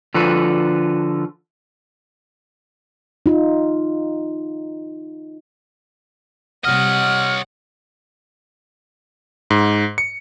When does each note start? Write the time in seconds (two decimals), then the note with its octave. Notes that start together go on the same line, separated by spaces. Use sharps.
0.14 D3 F3 F4 F#4 A4 B4
3.26 D#4 F4
6.65 C3 G3 C#5 D#5 F#5 F6
9.50 G#2
9.98 C#7